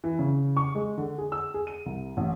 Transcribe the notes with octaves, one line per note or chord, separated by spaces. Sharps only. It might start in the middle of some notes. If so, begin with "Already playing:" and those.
E3
C#3
C#6
G#3
D3
G#4
E6
G#4
D#7
C2
A1